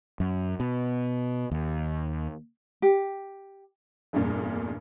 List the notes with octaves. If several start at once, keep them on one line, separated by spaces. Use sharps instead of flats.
F#2
B2
D#2
G4
F1 E2 G2 A#2